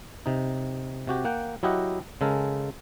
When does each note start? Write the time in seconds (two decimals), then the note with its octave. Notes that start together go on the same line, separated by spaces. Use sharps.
0.26 C3 D#4
1.07 C3 F#4 G4
1.25 A#3 F#5 G5
1.63 F#3 E4 G4 D#5 F#5
2.21 C#3 G#3 A4 A#4